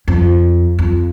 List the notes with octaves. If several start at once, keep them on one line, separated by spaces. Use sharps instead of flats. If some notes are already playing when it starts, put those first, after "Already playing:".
F2
F2